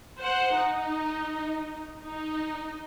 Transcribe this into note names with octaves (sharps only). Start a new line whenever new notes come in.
C5 F#5
D#4
D#4